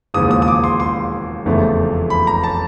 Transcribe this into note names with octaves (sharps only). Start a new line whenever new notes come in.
E1 D#2 C#3 F3 D#6
D#6
D#6
D6
C6
C6
F1 E2 C#3 F3 A3
B5
A#5
A5